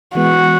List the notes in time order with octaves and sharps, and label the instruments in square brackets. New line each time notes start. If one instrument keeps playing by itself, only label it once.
[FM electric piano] E3 G#3 B3 [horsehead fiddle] F#4